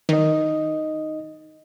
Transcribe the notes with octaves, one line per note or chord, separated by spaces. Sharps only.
D#3 D#4 D#5